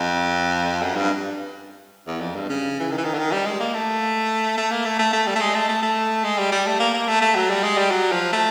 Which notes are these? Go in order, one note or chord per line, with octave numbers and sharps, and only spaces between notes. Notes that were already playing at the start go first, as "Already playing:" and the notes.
Already playing: F2
F#2
G2
E2
F2
G2
C#3
E3
D#3
E3
D#3
D3
D#3
G3
G#3
A#3
A3
A3
A#3
A3
A3
A3
G3
A3
G#3
A3
A3
A3
G#3
G3
G3
A3
A#3
A#3
A3
A3
F#3
G3
G#3
G3
F#3
F3
A3